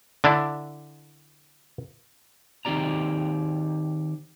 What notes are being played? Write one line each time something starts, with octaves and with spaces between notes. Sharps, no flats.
D3 D4 E4
D#3 C4 G4 D5 A#5